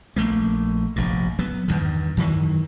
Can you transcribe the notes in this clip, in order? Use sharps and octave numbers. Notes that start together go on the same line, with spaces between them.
A#1 A3 A#3
F1 A#1 G2
F#3 B3
E2 G2 D#3
F#2 D#3 E3 F#3